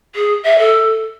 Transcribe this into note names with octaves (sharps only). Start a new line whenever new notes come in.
G#4
E5
A4